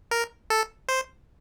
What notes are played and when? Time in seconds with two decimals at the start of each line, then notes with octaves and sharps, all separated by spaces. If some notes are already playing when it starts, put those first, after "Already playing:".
0.11 A#4
0.50 A4
0.89 C5